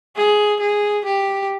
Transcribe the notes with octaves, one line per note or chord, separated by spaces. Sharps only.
G#4
G#4
G4